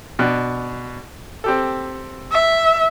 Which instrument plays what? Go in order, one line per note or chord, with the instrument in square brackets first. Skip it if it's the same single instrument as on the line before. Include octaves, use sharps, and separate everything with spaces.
[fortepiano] B2 D4 F#6
C4 G4 A4
[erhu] E5